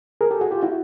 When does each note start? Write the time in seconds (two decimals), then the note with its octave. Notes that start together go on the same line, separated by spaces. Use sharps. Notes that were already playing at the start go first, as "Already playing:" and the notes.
0.21 G#4 A#4
0.31 G4 A4
0.41 F#4 G#4
0.51 F4 G4
0.63 E4 F#4